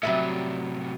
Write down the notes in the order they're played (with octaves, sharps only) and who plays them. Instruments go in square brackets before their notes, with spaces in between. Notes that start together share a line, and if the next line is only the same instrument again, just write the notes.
[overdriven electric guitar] A2 C3 [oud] F#3 G3 E5